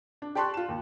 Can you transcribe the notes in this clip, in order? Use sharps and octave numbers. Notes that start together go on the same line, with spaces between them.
D4
G4 D5 A5 C6 C#6 F#6
F4 E7
D#2